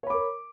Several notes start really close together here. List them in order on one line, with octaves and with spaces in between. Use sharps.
C#5 B5 D6 A#4